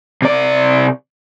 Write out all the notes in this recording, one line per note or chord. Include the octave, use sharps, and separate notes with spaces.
C3 D5